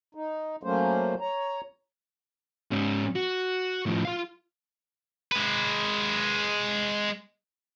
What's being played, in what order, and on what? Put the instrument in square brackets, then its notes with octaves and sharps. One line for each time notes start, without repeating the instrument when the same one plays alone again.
[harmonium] D#4
F#3 A3 A#3 C#4 C5
C#5 A#5
[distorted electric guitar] G#2 C#4
F#4
A2 F3
F4 F5
G#3 B4